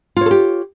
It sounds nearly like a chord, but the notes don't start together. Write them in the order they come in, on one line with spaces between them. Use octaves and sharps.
F4 C#5 A4 G4